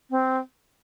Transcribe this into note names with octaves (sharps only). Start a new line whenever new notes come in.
C4